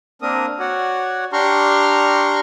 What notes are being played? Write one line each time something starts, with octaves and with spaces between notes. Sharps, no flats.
A#3 C4 D4 A#4 D#6
F#4 C#5 D5 F#5
D4 G4 A#5 C6 C#6 F6